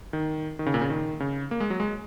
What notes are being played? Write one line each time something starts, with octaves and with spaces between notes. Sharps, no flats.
D#3
D#3
C#3
A#2
C#3
D#3
C#3
A#3
G#3
F#3
G#3